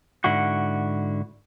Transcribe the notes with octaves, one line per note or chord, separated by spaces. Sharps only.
G#2 D3 E4 F#4